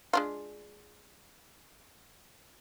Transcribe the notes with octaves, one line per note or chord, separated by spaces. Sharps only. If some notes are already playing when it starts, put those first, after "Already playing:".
G#3 D4 F4